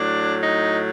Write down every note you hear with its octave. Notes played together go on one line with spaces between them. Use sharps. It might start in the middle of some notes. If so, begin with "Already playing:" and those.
Already playing: A2 F#3 D4
D#4